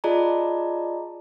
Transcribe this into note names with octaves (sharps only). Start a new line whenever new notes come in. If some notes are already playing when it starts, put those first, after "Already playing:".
F4 G#4 D5 D#5 A5 A#5